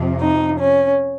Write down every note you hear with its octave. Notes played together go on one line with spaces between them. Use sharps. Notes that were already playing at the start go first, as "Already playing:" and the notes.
Already playing: F2 C3 F3
D#4
C#4